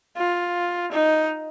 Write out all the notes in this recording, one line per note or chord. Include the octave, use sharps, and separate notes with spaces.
F4
D#4